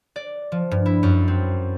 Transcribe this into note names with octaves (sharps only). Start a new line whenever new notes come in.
D5
F3
G2
E4
F#2
C4